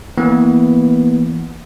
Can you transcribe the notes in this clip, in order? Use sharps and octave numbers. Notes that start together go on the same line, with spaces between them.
E3 A#3 B3